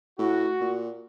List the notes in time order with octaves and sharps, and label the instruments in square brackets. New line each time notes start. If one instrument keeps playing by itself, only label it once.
[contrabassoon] A2 [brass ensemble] F#4
[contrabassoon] A#2